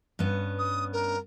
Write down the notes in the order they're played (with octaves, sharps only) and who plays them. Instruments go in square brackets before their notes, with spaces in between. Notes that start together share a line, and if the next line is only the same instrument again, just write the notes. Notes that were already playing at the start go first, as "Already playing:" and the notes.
[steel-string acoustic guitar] G2 B3 C#4
[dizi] D#6
A#4